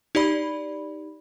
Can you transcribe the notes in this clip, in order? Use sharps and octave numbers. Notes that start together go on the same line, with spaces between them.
D#4 G4 D5 B5